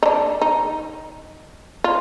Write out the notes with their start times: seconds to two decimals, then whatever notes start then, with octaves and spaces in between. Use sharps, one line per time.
0.03 D#4
0.06 D4
0.41 D#4
1.84 F4